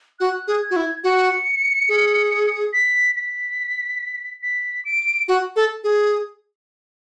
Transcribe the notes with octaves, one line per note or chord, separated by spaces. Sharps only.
F#4 F#6
G#4
G#6
F#4
E4
F#4 C#7
G#4
B6
B6
B6
D7
F#4
A4
G#4